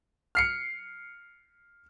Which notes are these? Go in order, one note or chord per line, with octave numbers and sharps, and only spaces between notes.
F6 C7 C#7